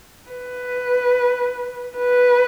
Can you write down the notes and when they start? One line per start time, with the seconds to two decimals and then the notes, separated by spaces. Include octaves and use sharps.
0.31 B4
1.97 B4